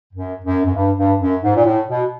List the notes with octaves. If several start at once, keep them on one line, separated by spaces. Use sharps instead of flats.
F#2
F#2
F#2
G2
G2
F#2
G#2
A#2
A2
B2